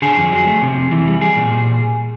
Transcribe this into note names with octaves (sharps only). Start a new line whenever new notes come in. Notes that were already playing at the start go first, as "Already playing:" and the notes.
D3 G#4
F2
F#3
A3
C3
F2
E3
G3
G3 G#4
A#2
A#2